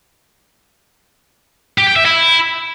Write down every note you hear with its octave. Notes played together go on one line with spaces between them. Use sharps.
G4
G5
E5
E4